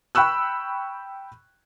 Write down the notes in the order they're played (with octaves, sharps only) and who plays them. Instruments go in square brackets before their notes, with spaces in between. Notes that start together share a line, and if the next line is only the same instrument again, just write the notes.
[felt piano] G5 B5 C#6 E6 F#6